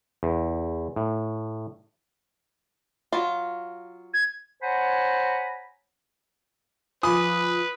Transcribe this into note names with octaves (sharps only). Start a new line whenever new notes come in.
E2
A2
F#3 F4
G#6
C5 C#5 F#5 G#5 A#5 B5
F3 F4 B4 G#5 B5 D6 D#6